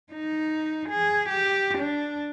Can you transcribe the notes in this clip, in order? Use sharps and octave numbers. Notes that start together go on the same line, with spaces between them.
D#4
G#4
G4
D4